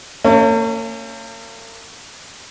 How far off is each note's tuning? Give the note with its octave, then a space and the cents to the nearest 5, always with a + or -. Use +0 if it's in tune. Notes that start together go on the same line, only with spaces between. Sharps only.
A#3 -45 C#4 +0